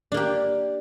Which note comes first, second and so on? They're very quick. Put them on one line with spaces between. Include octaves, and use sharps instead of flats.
D4 A#3 G4